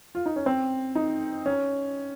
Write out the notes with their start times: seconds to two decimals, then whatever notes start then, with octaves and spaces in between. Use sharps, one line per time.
0.15 F4
0.26 D#4
0.36 C#4
0.46 C4
0.95 D#4
1.46 C#4